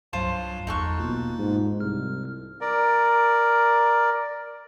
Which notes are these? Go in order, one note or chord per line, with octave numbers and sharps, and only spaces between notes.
C2 G2 F#3 F4 C5 A5
G1 E2 D#4 A4 C#6 F#6
B2 A#3 F4
G#2
C2 F6
A#4 D5